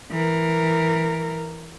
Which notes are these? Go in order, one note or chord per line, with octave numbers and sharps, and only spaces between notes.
E3 A#4